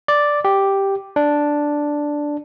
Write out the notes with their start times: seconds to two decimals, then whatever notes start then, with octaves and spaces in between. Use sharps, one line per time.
0.08 D5
0.45 G4
1.16 D4